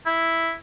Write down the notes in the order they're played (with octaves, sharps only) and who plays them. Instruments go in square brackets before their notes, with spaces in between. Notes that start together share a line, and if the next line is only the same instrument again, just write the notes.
[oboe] E4